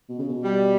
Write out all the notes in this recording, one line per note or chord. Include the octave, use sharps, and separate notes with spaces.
B2
C#3
B2
G3